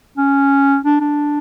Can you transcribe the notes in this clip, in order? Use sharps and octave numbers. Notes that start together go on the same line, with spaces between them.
C#4
D4
D4